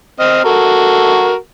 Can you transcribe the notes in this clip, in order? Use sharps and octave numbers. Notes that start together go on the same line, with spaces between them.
C4 D#5 F6
F#4 A4 A#4